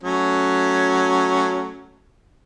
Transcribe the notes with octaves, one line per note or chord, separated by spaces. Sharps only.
F#3 A3 C#4